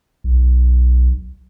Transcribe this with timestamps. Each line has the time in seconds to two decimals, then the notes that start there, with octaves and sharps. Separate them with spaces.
0.24 B1